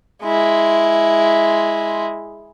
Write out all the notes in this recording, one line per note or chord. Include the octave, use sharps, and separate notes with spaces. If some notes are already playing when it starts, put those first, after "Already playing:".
G#3 E4